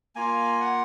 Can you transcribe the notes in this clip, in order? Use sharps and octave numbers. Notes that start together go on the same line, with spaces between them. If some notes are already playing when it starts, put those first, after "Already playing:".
A#3 F4 G#5
F#5